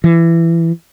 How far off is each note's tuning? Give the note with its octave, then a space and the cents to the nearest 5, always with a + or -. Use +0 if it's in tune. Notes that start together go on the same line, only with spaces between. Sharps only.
E3 +20